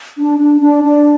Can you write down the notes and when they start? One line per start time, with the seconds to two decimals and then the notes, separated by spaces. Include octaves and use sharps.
0.17 D4
0.39 D4
0.61 D4
0.83 D4